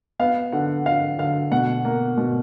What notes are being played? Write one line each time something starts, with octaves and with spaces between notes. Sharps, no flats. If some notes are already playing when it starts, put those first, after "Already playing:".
B3 F5
D3 F#5
D3 F5
D3 F5
B2 F#5
A#3
B2